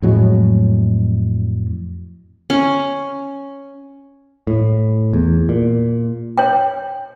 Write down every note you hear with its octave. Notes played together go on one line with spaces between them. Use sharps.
F2 A2 F#3 G#3
C#4
A2
E2
A#2
C#5 G5